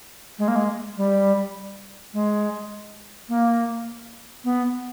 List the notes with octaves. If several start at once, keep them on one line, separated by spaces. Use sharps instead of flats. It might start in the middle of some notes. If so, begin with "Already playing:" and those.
G#3
A#3
G#3
G3
G#3
A#3
B3